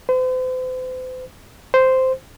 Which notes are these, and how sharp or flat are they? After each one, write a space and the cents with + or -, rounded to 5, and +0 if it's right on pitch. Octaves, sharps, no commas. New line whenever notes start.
C5 -40
C5 -5